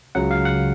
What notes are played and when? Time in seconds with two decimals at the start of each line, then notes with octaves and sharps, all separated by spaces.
0.15 C#2 C#3 F#3 F#5
0.31 F5
0.45 F#5